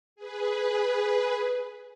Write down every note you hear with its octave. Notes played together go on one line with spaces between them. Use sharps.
G#4 B4